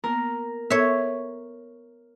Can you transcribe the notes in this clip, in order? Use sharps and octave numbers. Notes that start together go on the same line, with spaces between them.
A#3 B3 A#4
B3 A4 C#5 E5 C#6